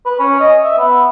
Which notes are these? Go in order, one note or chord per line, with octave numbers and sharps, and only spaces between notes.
B4
C#4
D#5
E5
B3